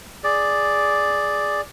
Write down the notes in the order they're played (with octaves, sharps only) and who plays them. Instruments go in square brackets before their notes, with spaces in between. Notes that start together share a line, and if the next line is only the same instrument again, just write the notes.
[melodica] G#4 D5